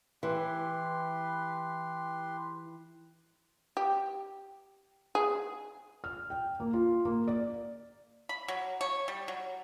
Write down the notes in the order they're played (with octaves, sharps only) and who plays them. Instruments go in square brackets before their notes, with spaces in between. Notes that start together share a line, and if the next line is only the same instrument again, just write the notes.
[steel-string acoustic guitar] E3 [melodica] G4 B4 C6
[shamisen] G4
G#4
[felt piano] F6
G5
A#3
F4
A#3
D5
[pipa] B5
F#3
C#5
G3
F#3